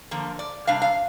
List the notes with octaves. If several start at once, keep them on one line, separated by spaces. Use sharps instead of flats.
D3 F3 A#3
D5
C3 G3 D4 F5
F5